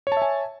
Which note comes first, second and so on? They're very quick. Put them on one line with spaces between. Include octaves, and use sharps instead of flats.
C#5 A5 E5 G#5